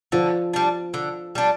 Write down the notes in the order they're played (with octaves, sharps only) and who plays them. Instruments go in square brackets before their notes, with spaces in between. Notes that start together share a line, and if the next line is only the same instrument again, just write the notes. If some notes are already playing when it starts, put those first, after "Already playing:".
[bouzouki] D3 [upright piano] F3
[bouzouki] G3 D4
D3
G3 D4